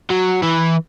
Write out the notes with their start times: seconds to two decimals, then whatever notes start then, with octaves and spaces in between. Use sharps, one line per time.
0.10 F#3
0.42 E3